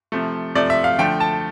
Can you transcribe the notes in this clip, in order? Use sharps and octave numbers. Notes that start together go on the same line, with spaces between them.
C3 F3 A3
C3 F3 A3 D5
E5
F5
D3 F3 A3 G5
A5